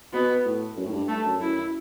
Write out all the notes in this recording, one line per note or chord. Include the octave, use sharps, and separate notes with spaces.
B2 B3
A2
F#2
A2
G2
A3
F#2
F#2 E4